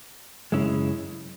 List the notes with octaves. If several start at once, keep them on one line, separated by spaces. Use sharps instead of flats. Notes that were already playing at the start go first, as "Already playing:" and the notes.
F#2 C#3 G#3 C#4 E4